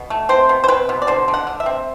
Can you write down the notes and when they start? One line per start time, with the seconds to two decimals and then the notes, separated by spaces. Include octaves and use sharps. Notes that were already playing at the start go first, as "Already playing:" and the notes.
Already playing: B2
0.10 A3
0.29 C4 C5
0.49 B2
0.64 C5
0.68 C4 B4
0.89 B2
1.02 D5
1.07 D3 C5
1.28 D3
1.34 F#5
1.47 D3
1.60 E5
1.66 C4